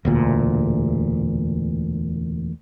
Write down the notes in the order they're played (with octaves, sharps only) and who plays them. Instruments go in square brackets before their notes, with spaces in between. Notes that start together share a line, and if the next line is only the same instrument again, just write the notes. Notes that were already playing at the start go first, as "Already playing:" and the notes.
[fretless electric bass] E1 D2 A#2